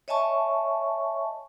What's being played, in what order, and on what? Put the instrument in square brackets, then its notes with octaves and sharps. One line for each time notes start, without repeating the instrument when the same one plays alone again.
[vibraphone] C#5 D#5 E5 G#5 A5 C#6